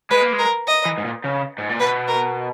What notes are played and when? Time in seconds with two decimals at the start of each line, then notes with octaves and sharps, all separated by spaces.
0.10 G#3 B4
0.21 A#3
0.32 G#3
0.39 A#4
0.67 D#5
0.85 E3
0.98 G#2
1.05 A#2
1.24 C#3
1.58 G#2
1.69 A#2
1.80 B2 B4
2.08 A#4